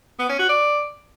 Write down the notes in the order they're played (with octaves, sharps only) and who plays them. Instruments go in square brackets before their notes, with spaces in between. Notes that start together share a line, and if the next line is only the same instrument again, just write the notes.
[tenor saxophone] B3
C#4
F#4
D5